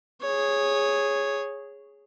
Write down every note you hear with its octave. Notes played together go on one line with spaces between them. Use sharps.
G#4 C#5